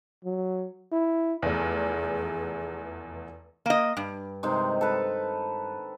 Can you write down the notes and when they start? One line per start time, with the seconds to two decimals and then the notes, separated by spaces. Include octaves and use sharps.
0.25 F#3
0.92 E4
1.42 F1 E2 G#4
3.66 A#3 D#5
3.97 G2
4.43 C3 D#3 G#3
4.81 A4 B4